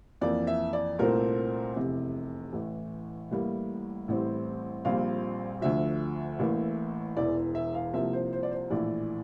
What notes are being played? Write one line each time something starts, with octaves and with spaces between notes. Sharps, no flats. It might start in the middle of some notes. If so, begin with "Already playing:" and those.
F2 E3 A#3 D5
E5
D5
C2 A#2 A3 C4 A#4
F1 E2 C3
A1 A2 E3
A1 A2 G3 A#3
A1 A2 G3 C4
A#1 A#2 G3 C4 F5
D2 D3 F3 E5
A1 A2 E3 A#3
E1 E2 E3 D5
E5
F5
C2 C3 F3 A#3 E5
C5
C5
D5
C5
A#1 A2 E3 D5